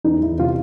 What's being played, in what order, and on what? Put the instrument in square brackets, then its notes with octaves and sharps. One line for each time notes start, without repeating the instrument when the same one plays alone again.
[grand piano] E2 D#4
E2 E4
C3 F4